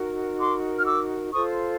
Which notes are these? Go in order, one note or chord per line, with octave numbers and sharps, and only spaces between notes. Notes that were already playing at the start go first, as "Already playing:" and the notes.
Already playing: D#4 F#4 A#4
C6 D6
F6
D6 E6
F4 A4 C5 C#6 D#6